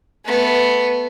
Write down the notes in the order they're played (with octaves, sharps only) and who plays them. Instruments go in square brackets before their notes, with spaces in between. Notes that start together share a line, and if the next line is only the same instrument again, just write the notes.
[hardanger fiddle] A3 B3